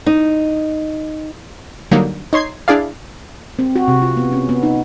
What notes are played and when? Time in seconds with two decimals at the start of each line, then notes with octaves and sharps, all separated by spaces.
0.06 D#4
1.91 D3 F#3 G3 A#3 D#4
2.33 D#4 C#5 C6 G#6 C7
2.68 D4 E4 G#4 D5 F5
3.59 C4
3.76 F#4
3.88 C3
4.02 F4
4.17 B3
4.32 C#4
4.49 B3
4.63 D#4